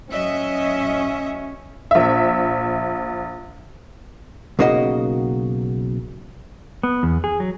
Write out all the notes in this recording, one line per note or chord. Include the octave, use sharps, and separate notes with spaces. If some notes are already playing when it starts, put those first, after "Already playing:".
F#3 C#4 D#5 E5
A#1 E5
B1 C#3 A#3 F#4 G4 D#5
B3
E2
G#4
F#3